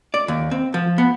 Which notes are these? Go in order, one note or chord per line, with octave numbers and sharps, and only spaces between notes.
D5
D#2
C4
F3
B3